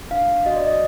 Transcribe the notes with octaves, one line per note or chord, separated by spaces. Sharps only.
D4 F5
D4
F#4 D#5
D5
F#4 D#5